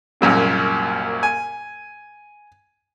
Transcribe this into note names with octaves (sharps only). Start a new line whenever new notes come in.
C2 F#2 A#2 C#3
G#5